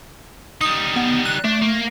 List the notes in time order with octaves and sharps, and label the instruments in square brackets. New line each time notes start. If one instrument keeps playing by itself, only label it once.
[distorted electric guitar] G3 D#4 [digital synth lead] D#6
[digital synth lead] B3
F#6
[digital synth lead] A3 [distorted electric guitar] D4
[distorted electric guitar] A#3